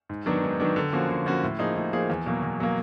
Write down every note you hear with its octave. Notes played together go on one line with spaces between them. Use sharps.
G#2
D#3 F#3 B3 D4
G#2
D#3 F#3 B3 D4
D3
F3 A#3 C#4 F#4
D3
F3 A#3 C#4 F#4
A2
F3 A#3 D#4 G#4
A2
F3 A#3 D#4 G#4
E2
B2 F#3 A#3
E2
B2 F#3 A#3